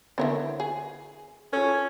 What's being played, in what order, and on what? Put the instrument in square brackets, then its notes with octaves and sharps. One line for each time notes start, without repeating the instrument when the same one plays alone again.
[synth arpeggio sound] D3 B3 C#5 [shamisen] E4 A#4 C5
[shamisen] G#4
[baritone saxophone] C#4 [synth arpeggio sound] F4 A4